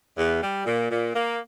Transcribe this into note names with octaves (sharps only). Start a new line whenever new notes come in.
E2
G3
A#2
A#2
A#3